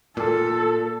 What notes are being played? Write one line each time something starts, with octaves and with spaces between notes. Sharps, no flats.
A#2 A4